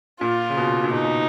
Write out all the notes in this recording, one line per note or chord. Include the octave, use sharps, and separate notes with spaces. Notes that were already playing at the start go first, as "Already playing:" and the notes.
A#2 F4
C#3
B2
A#2
B2 D#4
B2